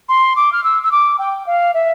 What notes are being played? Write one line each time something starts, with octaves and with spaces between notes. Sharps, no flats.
C6
D6
F6
E6
E6
D6
G5
F5
E5